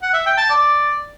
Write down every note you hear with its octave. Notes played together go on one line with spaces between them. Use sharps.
F#5
E5
G5
A5
D5